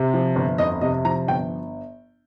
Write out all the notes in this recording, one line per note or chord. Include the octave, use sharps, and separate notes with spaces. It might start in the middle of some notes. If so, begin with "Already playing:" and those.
Already playing: C3
F3
G1
F2 D#5
C3 D#5
F3 A#5
G1 G5